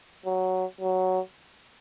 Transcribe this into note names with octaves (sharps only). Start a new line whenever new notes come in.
F#3
F#3